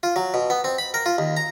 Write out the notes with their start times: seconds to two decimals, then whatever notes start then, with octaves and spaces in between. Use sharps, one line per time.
0.03 F4
0.16 F#3
0.34 B2
0.50 B3
0.64 C4
0.78 B5
0.94 A#4
1.06 F4
1.18 D#2
1.37 A#5